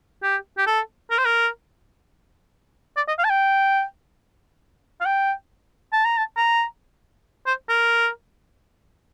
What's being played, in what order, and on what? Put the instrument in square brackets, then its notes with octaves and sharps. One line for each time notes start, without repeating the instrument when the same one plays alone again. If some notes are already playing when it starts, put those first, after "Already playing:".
[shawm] G4
G4
A4
A#4
C5
A#4
D5
D#5
F5
A5
G5
F5
G5
A5
A#5
A5
A#5
C5
A#4